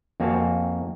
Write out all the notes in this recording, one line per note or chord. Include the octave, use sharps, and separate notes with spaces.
F2 A#3 C4 F#4 G#5 A5